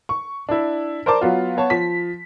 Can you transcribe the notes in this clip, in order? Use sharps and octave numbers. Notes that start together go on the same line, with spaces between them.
C#6
D4 E4
A#4 C5 D5 A5 D6
F#3 B3 F4
B3 C#5 A5
F3 B6